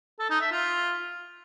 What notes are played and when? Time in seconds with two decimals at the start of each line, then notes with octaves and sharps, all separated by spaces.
0.19 A4
0.30 D#4
0.41 E5
0.52 F4